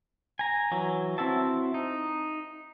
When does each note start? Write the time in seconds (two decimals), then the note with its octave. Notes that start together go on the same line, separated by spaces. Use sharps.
0.39 G#5 A#5
0.72 E3 F#3
1.18 C4 E4 F#4 E5 A5
1.74 D#4